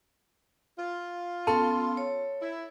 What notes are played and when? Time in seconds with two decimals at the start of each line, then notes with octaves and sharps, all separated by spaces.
0.78 F4
1.47 B3 C#4 A4 C6
1.97 C#5
2.40 E4